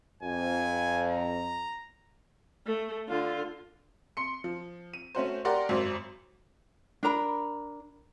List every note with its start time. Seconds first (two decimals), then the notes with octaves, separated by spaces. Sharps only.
0.23 F2 G#5
1.11 A#5
2.66 A3
3.09 D3 F4
4.17 C6 C#7
4.44 F3
4.94 D#7
5.15 A3 C#4 F#4 C5
5.45 G4 A#4 D5 F#5 C6
5.69 G#1 F#2 F#3 C5
7.03 D4 A#4 A#5 B5